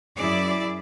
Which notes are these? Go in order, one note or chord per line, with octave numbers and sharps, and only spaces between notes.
F#2 E4 G#4 D5